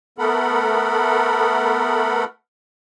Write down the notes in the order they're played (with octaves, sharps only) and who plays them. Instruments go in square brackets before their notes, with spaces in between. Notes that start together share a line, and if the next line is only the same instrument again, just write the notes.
[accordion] A3 B3 A4 A#4 F#5 B5